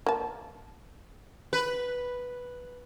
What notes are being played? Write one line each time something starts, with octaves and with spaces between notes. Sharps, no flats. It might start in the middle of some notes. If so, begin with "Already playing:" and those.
A#3 A5
B4